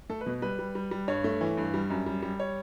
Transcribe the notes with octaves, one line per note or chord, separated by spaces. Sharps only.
A3 A4
B4
B2
G3 B4
G3
G3
G3
G2 C#5
A3
E3
G2
G3
F#2
G3
G3
C#5